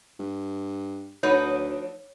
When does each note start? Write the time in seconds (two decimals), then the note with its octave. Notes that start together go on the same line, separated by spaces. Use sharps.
0.20 G2
1.23 D2 F3 D#4 A4 B4 C#5 D5